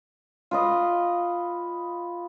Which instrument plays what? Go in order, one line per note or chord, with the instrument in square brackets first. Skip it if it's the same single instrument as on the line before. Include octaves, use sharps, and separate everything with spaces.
[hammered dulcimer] F4 B4 D#5